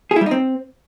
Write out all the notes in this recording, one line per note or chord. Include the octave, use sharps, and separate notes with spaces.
G#4
E4
G3
D#4
C4